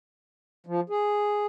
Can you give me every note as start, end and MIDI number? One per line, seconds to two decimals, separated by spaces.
0.67 0.80 53
0.90 1.46 68